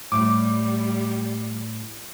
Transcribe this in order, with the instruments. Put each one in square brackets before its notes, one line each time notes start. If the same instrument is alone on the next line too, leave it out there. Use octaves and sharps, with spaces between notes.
[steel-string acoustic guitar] A2 [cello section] G3 [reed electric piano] D6